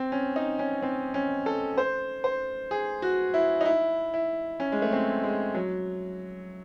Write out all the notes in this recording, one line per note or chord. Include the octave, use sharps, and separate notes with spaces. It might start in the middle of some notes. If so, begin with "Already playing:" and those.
Already playing: C4
C#4
D#4
C#4
C4
C#4
A4
C5
C5
G#4
F#4
E4
D#4
E4
E4
C#4
G#3
A3
C4
G#3
F#3